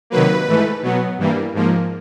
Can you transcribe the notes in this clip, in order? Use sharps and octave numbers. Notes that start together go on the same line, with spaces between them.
C3 D#3 F#3 A#3 B4
G#2 E3 A3
B2 F#3 B3
G2 E3 G3 A#3
G#2 F3 A#3